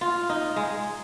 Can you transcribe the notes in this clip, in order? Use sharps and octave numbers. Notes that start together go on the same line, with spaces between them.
F4
D#4
G#3